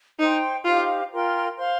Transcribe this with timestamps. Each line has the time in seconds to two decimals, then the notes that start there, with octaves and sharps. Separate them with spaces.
0.19 D#4 C5 G5 C6
0.65 D#4 F4 G4 C5 F5
1.11 F4 A#4 G5 C6
1.57 C5 F5 C6